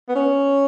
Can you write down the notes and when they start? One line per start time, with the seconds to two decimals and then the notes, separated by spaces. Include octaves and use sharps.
0.09 B3
0.16 C#4